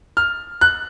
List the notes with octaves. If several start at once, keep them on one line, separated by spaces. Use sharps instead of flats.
F6
F#6